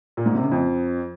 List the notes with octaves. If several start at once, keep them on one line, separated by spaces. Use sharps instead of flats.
A#2
G#2
C3
C#3
F2